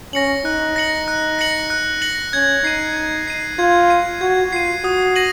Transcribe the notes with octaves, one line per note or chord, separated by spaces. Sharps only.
C#4 A#6 C#7 F#7
D#4 F#6
A#6 C#7 F#7
F#6
A#6 C#7 F#7
F#6
A#6 C#7 F#7
C#4 G#6
D#4 C7 D#7
G#6
C7 D#7
F4 G#6
C7 D#7
F#4 G#6
F4 C7 D#7
F#4 D#6
A#6 D#7 F#7